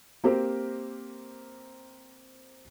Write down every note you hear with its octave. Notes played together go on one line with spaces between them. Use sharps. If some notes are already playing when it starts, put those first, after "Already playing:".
A#3 C4 G4 A#4 C5